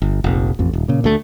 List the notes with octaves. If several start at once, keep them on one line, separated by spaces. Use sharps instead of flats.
G1
F1 A#1
A1 F2
D#1
A#2 C#3
D2 A3